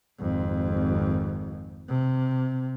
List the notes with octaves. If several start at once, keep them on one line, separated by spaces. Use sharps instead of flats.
G#1 F2
C3